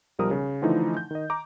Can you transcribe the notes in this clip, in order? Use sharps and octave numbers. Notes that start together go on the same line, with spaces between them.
B1 F3 G3 A#4 D#6
C#3
D3 E3 F3 A3 D#4 E4
G6
D#3 D#5
A#5 D6